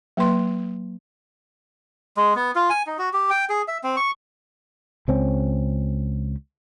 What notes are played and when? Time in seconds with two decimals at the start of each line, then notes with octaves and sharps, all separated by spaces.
0.17 F#3 A#3 B4 C6
2.17 G#3
2.36 B3
2.55 F4
2.70 G#5
2.87 D#4
2.98 F#4
3.13 G4
3.30 G5
3.49 G#4
3.68 E5
3.84 C4
3.97 C#6
5.08 C#2 C4 C#4